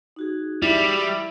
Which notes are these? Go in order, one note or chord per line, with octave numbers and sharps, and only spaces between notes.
D#4 F#4 G#4
G3 E4